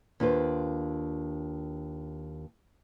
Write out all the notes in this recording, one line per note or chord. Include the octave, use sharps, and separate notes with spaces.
D#2 D4 F4 B4 C5